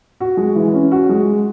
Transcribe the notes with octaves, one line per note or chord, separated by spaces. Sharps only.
F#4
G#3
E3
C#4
F#4
G#3